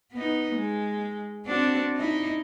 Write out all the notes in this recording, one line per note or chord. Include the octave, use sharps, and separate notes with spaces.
B3 D#4
G#3
C4 D4 F#4
D#4 E4